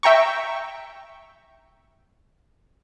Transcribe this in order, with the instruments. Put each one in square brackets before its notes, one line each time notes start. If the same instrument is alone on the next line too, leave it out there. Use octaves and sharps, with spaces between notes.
[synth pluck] E5 G5 A#5 C#6